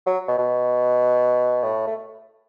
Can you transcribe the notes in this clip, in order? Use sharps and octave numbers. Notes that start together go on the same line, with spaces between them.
F#3
B2
B2
A2
A3